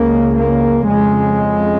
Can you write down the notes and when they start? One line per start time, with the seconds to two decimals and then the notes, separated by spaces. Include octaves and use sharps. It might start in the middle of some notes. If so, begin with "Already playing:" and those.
Already playing: C#2 C#3 A#3
0.36 A#3
0.87 F2 C#3 G#3